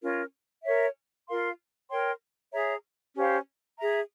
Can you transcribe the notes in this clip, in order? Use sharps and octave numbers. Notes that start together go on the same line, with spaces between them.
C#4 F4 A#4
A#4 C#5 E5
F4 A#4 F5 C6
A#4 C#5 G5 C6
G#4 C#5 E5 A#5
C#4 G4 C5 F5
G#4 E5 A#5